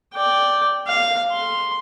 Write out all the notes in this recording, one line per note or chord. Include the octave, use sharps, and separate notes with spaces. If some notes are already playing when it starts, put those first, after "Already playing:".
D5 G5
F5
C6